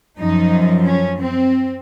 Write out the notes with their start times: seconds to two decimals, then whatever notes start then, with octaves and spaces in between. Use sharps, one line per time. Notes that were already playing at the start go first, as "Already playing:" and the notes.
0.18 F#2 F3 D#4
0.87 C#4
1.21 C4